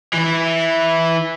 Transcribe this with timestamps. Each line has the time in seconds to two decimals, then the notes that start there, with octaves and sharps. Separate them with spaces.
0.14 E3 E4